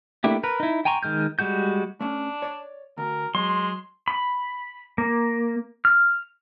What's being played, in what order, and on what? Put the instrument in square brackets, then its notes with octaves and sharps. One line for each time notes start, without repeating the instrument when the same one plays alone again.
[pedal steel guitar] A3 A#3 D4 E4 G4
A#4 B4
D#4 E4
G5 G#5 A#5 C6 C#6
D#3 G#3 F6 G6
G3 G#3 F#4 G6
[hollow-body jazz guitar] A3 C#4 [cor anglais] D4
[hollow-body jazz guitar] C#5 D5
[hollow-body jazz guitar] D2 [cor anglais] A#4
[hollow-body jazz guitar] F#3 [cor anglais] G#3 [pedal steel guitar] C6
[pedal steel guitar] B5
A#3
F6